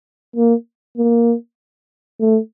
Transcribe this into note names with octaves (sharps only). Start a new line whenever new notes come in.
A#3
A#3
A3